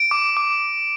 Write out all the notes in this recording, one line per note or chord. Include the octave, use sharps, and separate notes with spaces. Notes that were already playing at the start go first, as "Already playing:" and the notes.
Already playing: D7
D6
D6